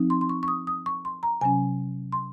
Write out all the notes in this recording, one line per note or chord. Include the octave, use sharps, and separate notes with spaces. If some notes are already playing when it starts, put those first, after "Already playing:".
Already playing: F3 C4 D#4
C6
C6
C#6
C#6
D#6
D#6
C#6
C6
A#5
C3 F#3 C#4 G#5
C6